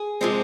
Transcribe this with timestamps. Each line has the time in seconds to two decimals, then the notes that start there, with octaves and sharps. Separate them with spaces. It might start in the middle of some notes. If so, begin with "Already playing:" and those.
Already playing: G#4
0.21 C3 F3 G#3 C4